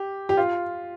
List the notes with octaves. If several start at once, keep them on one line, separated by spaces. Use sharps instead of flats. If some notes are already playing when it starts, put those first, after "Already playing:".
Already playing: G4
G4
F4